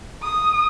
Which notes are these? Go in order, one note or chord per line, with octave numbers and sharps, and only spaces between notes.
D#6